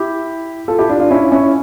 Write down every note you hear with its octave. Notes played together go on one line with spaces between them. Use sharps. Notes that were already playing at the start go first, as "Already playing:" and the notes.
Already playing: E4 G4
F4 A4
E4 G4
D4 F4
D4 F4
C#4 E4
C#4 E4